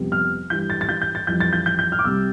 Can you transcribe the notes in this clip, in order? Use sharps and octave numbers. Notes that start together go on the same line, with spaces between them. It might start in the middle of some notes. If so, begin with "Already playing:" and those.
Already playing: F2 C3 G3 B3
F6
G2 E3 G3 G6
A6
A6
G6
G6
A6
F2 E3 G3 G6
A6
G6
G6
G6
F6
D6
C2 C3 G3 E6